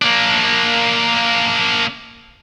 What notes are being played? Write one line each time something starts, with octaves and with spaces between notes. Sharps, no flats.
A#3 D4